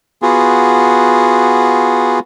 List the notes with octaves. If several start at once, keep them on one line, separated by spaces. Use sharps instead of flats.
B3 F4 F#4 G#4